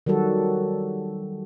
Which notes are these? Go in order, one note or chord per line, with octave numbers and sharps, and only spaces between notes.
D#3 F#3 G3 F#4 A4